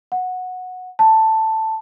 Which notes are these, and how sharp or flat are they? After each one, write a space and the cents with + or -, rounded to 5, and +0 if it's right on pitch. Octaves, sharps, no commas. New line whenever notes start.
F#5 -10
A5 +5